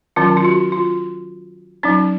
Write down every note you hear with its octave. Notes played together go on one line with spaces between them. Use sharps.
D#3 F#3 C#4 F4
F4
F#4
F4
F#3 C#4 D#4